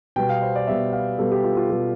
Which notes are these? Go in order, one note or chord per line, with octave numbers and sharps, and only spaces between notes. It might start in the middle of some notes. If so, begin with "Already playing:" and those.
B2 G3 B3 G5
F5
C5
D5
B2 G3 B3 E5
F5
B2 G3 B3 A4
G4
F4
F4
B2 G3 B3 G4